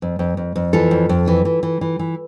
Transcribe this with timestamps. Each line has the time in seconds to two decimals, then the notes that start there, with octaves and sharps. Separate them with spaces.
0.02 F2
0.19 F2
0.37 F2
0.56 F2
0.73 E3 F4 A4
0.91 F2
1.09 F2
1.27 E3
1.45 E3
1.63 E3
1.81 E3
1.99 E3